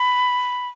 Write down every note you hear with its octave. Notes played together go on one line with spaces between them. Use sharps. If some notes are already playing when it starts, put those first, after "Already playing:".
Already playing: B5